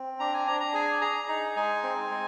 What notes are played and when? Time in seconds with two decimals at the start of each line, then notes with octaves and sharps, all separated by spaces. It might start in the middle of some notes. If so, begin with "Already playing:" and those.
Already playing: C4
0.20 D4 A#5
0.34 G#5
0.47 D4 A#5
0.60 A#5
0.74 G#4 G#5
1.01 G#4 A#5
1.28 D#4 A#5
1.56 G#3 G#5
1.83 C4
2.11 G#3